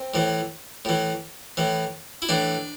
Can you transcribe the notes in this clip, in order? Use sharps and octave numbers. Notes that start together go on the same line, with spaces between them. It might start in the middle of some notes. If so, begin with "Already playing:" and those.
Already playing: C4
A2 E3
A2 E3
A2 E3
E4
A2 E3 D4